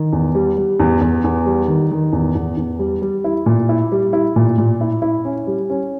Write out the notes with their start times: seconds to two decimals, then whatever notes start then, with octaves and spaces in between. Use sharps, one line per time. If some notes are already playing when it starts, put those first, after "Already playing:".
Already playing: D#3
0.13 E2
0.35 G3
0.57 G3
0.80 E2
1.01 E2
1.24 E2
1.46 G3
1.68 D#3
1.91 D#3
2.13 E2
2.35 E2
2.57 E2
2.79 G3
3.02 G3
3.24 E4
3.46 A#2
3.69 E4
3.92 G3
4.13 E4
4.36 A#2
4.58 A#2
4.81 E4
5.02 E4
5.25 C#4
5.47 G3
5.70 C#4